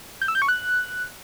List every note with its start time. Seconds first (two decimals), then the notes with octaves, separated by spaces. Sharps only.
0.22 G6
0.28 E6
0.35 G6
0.42 C#6
0.48 F#6